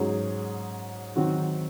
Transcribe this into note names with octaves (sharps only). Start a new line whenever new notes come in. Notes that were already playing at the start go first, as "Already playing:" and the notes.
Already playing: G#2 F#3 C#4 G#4
D#3 F#3 C4 F#4